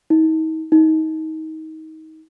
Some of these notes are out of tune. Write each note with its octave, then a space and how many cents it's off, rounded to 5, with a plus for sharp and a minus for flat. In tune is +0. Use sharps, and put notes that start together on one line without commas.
D#4 +40
D#4 +25